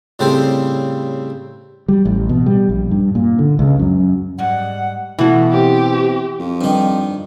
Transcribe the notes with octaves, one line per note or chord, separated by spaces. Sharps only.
A2 C#3 G3 C4 A4 C5
G3
A1
B2
G3
A#1
G2
A#2
D3
C#2
F#2
G#2 G3 F#5
B2 E3 A3 F#4
C4 G4
F2
G2 D#3